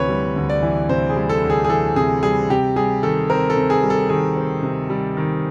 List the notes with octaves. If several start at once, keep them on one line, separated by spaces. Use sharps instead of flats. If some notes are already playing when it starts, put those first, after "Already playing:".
Already playing: D2 C3 E3 B4 C#5
G3
D2
D5
E3
C3 C5
G#4
G3
A4
D2
G#4
G#4
E3 A4
C3 G#4
G3 G#4
C3 G4
G3 G#4
D#3 A4
C4 A#4
A4
C3
G#4
G3
A4
D#3 G#4
C4
C3
G3
D#3